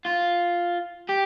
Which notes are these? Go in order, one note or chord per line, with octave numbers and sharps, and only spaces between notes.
F4
G4